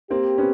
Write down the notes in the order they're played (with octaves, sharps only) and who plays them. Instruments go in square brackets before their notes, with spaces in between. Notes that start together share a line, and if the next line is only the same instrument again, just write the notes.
[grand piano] A#3 C4 [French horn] G4
[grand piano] B3 C#4